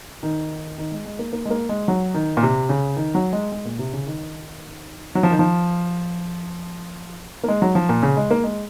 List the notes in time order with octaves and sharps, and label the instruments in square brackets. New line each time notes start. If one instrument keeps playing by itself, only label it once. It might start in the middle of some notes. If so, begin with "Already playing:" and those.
[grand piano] D#3
D#3
G#3
G#3
A#3
A#3
G#3
A#3
G#3
F#3
D#3
A#2
C3
C#3
D#3
F#3
G#3
G#3
A#2
C3
C#3
D#3
F#3
F3
D#3
F3
A#3
G#3
F#3
F3
A#2
C#3
G#3
A#3
G#3